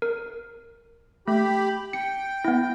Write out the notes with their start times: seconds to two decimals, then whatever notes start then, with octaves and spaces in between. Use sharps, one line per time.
0.02 A#4
1.28 A3 G4 B5
1.93 G5 C#7
2.45 B3 E4